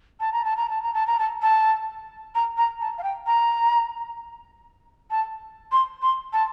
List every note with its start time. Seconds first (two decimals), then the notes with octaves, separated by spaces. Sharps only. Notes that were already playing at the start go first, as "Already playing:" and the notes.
0.20 A5
0.33 A#5
0.45 A5
0.57 A#5
0.70 A5
0.82 A#5
0.94 A5
1.07 A#5
1.19 A5
1.42 A5
2.35 A#5
2.58 A#5
2.81 A5
2.98 F5
3.03 G5
3.27 A#5
5.11 A5
5.72 C6
6.02 C6
6.33 A5